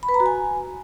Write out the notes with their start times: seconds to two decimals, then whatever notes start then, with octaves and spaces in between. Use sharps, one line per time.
0.03 B5
0.09 B4
0.14 A#5
0.20 F#4
0.26 G#5